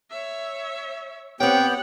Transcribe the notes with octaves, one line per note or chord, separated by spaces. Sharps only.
C#5 E5
B3 C4 G4 C#5 F#5 G5